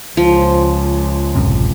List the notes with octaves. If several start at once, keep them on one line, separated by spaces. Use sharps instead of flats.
C#2 F3
A1 F#2 C3